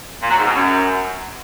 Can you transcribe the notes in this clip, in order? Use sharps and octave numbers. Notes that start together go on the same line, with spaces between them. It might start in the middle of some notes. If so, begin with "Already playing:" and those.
A#2
F#3
G#2
B2
F#2